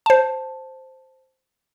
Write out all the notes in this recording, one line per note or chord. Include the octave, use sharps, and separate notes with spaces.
C5 A5